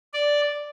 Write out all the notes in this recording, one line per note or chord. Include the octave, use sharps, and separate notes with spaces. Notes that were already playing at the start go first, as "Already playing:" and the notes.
D5